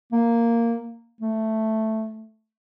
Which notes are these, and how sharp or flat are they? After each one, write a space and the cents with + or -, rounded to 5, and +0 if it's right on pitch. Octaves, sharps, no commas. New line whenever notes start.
A#3 -5
A3 +0